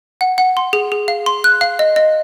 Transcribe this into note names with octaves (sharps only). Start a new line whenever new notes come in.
F#5
F#5
C6
G#4
G#4
F5
C6
F#6
F5
D#5
D#5